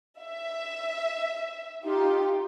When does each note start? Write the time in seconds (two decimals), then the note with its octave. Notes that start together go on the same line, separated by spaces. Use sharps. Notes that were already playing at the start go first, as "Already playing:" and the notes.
0.22 E5
1.85 D#4 F4 G4